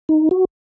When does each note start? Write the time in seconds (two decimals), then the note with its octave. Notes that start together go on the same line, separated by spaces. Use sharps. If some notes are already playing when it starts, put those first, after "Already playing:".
0.09 D#4
0.31 F#4